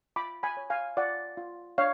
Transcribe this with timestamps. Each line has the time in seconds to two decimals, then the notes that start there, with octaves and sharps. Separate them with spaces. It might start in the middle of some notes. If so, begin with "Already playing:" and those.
0.16 F4 B5 D6
0.43 G#5 B5
0.57 C#5
0.70 F5 G#5
0.97 F4 D5 F#5
1.37 F4
1.78 D4 C#5 F5